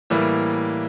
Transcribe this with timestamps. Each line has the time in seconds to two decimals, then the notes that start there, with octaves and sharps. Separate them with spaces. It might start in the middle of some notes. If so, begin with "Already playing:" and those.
0.10 A2 E3 G3 A#3